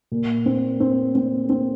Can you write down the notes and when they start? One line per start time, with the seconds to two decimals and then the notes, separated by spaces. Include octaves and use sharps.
0.12 A#2
0.46 C4
0.80 C4
1.15 C4
1.49 C4